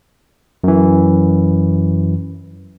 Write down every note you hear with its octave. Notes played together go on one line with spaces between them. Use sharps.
F#2 E3